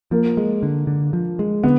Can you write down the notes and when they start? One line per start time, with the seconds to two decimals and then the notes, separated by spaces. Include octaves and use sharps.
0.11 F3 A#3
0.37 G#3
0.63 D3
0.87 D3
1.13 F3
1.39 G#3
1.63 D3 B3